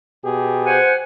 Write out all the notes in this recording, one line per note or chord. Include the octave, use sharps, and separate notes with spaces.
B2 G4 G#4
C5 F#5 G#5